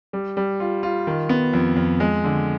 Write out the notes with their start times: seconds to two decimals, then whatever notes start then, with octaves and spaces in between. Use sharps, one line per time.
0.13 G3
0.37 G3
0.60 F4
0.83 F4
1.07 D#3
1.29 B3
1.53 F2
1.76 F2
2.00 G#3
2.24 D3